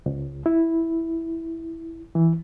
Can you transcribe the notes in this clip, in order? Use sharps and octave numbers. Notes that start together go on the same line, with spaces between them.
C#2
E4
E3